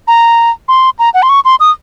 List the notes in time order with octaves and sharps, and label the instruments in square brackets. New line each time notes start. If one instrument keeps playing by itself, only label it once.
[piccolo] A#5
C6
A#5
F#5
C6
C#6
C6
D#6